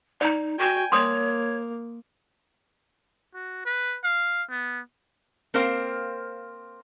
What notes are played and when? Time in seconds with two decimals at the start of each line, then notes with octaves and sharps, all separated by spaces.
0.21 D#4 D5 A#5
0.59 F#4 G5 G#5
0.92 A#3 C#5 C6 D#6
3.34 F#4
3.65 B4
4.04 F5
4.51 B3
5.54 A#3 C4 A#4 C5 F5